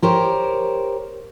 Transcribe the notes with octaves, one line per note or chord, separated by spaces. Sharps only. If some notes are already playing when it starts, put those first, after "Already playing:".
G4 A#4 C5 C#5